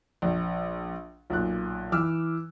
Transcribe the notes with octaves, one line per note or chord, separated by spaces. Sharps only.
A#1
B1 A#2 F#6
E3 D6 E6 F6